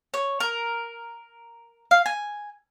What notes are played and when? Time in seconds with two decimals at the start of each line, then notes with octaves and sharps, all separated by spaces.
0.14 C#5
0.40 A#4
1.91 F5
2.06 G#5